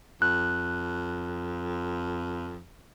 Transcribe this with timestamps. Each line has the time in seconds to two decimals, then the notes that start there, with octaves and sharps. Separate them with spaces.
0.22 F2 F#6